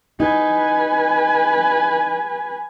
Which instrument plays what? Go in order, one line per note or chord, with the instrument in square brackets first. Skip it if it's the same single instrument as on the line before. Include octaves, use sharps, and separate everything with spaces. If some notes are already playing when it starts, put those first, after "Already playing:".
[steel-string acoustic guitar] D#4 [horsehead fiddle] B4 G#5